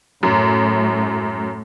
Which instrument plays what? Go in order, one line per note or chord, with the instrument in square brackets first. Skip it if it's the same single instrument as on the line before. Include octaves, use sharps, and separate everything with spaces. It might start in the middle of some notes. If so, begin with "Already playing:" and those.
[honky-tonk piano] F#2 [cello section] A2